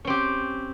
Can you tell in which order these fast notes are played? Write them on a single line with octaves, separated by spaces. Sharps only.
C#4 C4 G4